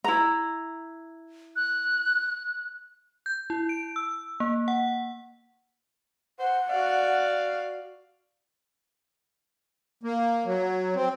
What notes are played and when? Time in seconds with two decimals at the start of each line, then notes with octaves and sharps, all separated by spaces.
0.04 E4 A#5
1.56 F#6
3.26 G6
3.50 E4
3.69 D7
3.96 E6
4.40 A#3
4.68 F#5
6.39 C5 F#5
6.69 F#4 D5 F5
10.03 A#3
10.45 F#3
10.95 C4